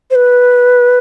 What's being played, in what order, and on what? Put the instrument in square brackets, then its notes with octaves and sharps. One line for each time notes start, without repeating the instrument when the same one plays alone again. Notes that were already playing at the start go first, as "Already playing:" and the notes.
[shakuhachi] C5
B4